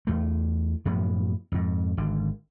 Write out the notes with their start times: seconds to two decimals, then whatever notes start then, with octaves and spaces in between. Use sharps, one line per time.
0.07 E2 A3
0.85 F#2 A2 F3 B3
1.52 F2 G#2
1.97 G#1 D3